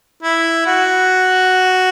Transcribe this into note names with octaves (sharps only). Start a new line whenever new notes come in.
E4
F#4